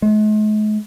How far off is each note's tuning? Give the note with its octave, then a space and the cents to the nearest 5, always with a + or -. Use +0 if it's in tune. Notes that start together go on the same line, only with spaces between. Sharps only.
G#3 +45